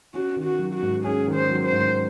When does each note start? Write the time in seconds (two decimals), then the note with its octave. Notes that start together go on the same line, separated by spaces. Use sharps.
0.14 C#4 F#4
0.36 D#3
0.44 F#4
0.59 F#3
0.74 F#4
0.82 G#2
1.04 C#4 G#4
1.27 D#3
1.34 C5
1.50 F#3
1.65 C5
1.72 G#2